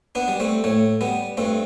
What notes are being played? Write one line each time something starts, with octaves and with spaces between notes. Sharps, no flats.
B3 D4
G3
A3 C4
A2 A3
G3 B3
G2 A3 C4